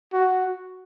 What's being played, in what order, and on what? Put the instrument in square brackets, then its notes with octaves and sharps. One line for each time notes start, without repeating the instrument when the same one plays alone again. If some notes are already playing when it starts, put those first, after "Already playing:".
[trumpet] F#4